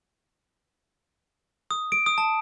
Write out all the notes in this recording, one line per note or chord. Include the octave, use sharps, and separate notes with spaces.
D#6
D7
D#6
A5